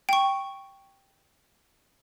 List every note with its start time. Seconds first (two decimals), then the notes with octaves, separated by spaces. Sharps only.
0.09 G5 C#6